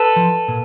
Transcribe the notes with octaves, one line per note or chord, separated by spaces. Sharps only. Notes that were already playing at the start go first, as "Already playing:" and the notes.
Already playing: A4 B4
F3
A#2